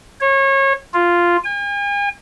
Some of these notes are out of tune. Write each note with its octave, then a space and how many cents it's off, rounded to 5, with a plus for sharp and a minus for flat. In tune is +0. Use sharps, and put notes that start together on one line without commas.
C#5 -30
F4 -5
G#5 -45